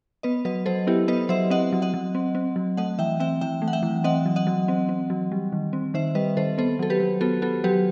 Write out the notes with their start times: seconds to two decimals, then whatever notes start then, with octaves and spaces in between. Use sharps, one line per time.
0.23 B3 B4 D#5
0.45 F#3 B4 D#5
0.66 F#3 A4 C5
0.87 B3 E4 G4
1.08 B3 B4 D#5
1.29 F#3 C5 E5
1.50 C4 D#5 F#5
1.72 F#3
1.82 D#5 F#5
1.94 F#3
2.15 C4
2.35 C4
2.56 F#3
2.77 A3 D#5 F#5
2.99 E3 E5 G5
3.20 C4 E5 G5
3.41 E3 E5 G5
3.62 A3
3.68 F#5
3.73 E5 G5
3.83 E3
4.04 C4 D#5 F#5
4.26 F#3
4.36 D#5 F#5
4.47 F#3
4.68 C4
4.89 C4
5.10 F#3
5.32 G3
5.52 D#3
5.73 C4
5.94 D#3 C5 E5
6.15 G3 B4 D#5
6.37 D#3 A4 C5
6.58 B3 A4 C5
6.79 F#3 A4
6.90 G4 B4
7.00 F#3
7.21 B3 F#4 A4
7.42 B3 F#4 A4
7.64 F#3 G4 B4